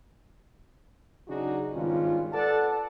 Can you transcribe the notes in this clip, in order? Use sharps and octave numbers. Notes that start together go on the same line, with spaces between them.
C#3 F#3 D4 D#4 F#4 G#4
G#1 G2 C#4 F4
A4 B4 D5 F#5 A5